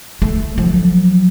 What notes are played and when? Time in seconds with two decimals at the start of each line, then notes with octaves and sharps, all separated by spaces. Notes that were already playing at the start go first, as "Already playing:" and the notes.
0.22 A3
0.58 F3 F#3